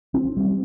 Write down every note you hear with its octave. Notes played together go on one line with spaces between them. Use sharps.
C4
G3